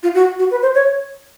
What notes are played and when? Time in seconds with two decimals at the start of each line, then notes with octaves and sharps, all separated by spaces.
0.03 F4
0.15 F#4
0.39 F#4
0.51 B4
0.62 C5
0.75 C#5